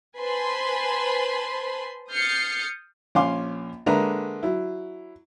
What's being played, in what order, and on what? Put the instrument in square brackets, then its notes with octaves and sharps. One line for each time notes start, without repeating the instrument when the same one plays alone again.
[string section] B4 C5 G#5 A5 B5 C6
D#6 F6 G6 A6 C7 C#7
[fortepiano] A#1 C#4 F5 G#5 C6 D6
D3 G#3 A#3 B4 E5 A#5
F#3 E4